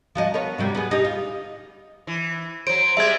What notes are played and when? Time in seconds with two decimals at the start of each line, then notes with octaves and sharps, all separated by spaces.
0.15 F3 F#3 D#5
0.34 B3 A#4 C#5
0.58 C3 F#3 G3
0.75 B3 G#4
0.91 D#4 G4
1.05 F4
2.07 E3
2.67 F#3 C5 D7
2.97 G3 G#3 C4 E5 G#6